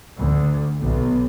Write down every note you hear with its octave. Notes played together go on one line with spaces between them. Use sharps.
D2
B1